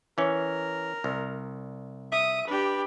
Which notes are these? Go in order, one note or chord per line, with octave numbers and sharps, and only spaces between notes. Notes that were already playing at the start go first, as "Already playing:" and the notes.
E3 C#4 A#4
C2
E5 D#6
D4 G4 B4